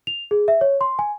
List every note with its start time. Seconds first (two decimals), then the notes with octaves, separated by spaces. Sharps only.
0.07 F7
0.31 G#4
0.48 E5
0.61 C#5
0.81 C6
0.99 G#5